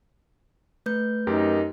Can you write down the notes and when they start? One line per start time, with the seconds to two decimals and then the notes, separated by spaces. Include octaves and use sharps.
0.86 A3 B4 G6
1.27 F#2 D#4 G4 A#4